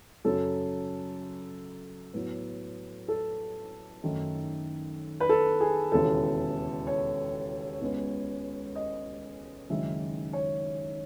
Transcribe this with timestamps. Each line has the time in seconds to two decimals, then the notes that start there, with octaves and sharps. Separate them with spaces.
0.25 F#2 C#3 F#3 A4
2.13 A2 F#3 B3
3.08 A4
4.03 F#2 D#3 A3
5.20 B4
5.29 A4
5.60 G#4
5.92 E1 D#2 C#3 E3 B3 A4
6.87 C#5
7.81 C#2 C#3 G#3 B3
8.75 D#5
9.70 F#1 F#2 D#3 G#3 E5
10.33 C#5